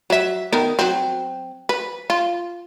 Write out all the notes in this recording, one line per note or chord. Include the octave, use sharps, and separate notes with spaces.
F#3 E5
D#3 B3 A#4
F#3 C4
B4
F4